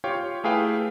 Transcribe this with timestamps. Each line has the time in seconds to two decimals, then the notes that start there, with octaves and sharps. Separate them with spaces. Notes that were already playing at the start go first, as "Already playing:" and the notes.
0.04 F4 G4 C#5 F5 G5
0.44 A3 E4 G#4 B4 F5 G5